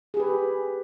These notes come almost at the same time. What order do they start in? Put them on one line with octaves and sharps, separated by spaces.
G#4 G4 B4